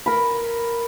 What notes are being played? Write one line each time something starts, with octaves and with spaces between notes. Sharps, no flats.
A#4 B5